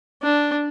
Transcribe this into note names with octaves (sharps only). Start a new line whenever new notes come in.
D4